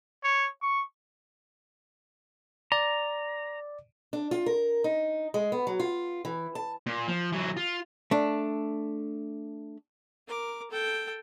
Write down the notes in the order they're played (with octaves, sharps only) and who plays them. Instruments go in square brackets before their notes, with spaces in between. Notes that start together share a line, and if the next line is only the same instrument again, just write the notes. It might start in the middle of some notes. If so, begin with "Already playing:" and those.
[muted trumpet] C#5
C#6
[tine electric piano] D5 [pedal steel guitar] A#5
[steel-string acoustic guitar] D4
F4
A#4
D#4
G#3
B3
F#3
F4
E3
A5
[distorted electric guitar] A#2
F3
E3 F#3
F4
[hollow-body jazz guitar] A3 D4
[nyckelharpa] A#4 D6
A4 G5